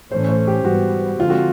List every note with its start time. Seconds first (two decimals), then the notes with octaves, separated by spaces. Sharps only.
0.11 A2 E3 A3 C#4 C5
0.29 C5
0.47 G4
0.65 G#2 E3 G3 B3 F#4
1.19 D3 F3 G#3 C4 F4
1.30 F#4